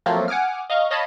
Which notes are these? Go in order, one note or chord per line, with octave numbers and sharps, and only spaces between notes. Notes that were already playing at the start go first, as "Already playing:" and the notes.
F3 F#3 A3 A#3 C4 F4
F#5 G#5 D6 D#6 F6
D#5 F5 A#5 C#6
C#5 D#5 F5 A5 B5